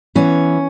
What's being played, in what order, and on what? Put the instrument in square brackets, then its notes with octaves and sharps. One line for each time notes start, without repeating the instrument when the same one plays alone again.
[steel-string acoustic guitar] E3 B3 C#4